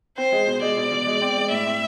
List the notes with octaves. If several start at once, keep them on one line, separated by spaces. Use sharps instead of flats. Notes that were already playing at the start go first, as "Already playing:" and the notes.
C4 C5
G#3
B2
G#3 D5
B2
B2
G#3
C4
G#3
A2 E5
C4